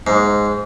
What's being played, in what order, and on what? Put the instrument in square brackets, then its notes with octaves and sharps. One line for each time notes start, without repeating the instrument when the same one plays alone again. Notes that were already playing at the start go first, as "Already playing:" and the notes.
[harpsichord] G#2